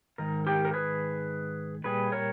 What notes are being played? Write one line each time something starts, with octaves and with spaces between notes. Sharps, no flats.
G#2 D#3 A#4
G4 A#4
A#4
G#4 B4
A#2 G3 G#4 B4
A#4 C#5